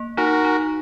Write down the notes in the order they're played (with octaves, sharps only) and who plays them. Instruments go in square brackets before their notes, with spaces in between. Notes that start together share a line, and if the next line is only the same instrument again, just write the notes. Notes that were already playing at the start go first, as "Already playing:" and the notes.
Already playing: [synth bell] A#3
[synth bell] D#4 [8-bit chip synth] F#4 A#4
[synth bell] D#4